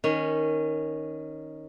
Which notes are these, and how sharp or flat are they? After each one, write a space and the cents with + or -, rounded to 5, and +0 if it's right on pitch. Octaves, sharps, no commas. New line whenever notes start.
D#3 +0 C#4 -10